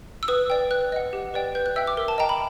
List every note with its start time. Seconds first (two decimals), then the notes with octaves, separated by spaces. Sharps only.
0.23 E6
0.28 B4 D#6
0.50 D5 G5
0.71 B4 F#6
0.92 D#5 F#5
1.13 G4
1.34 B4 D5 G5
1.55 B4 G6
1.66 F#6
1.76 E5 G5 E6
1.87 D6
1.97 A#4
2.08 A5
2.18 D#5 G5 A#5
2.29 B5